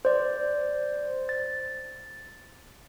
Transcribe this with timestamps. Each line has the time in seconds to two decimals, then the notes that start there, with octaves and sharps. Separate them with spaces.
0.05 C5 D5
1.29 A6